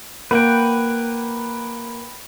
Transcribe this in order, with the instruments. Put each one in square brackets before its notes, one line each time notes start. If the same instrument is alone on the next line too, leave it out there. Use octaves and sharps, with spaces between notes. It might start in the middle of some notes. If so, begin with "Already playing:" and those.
[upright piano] A#3 [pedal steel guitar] B4 F#5 G5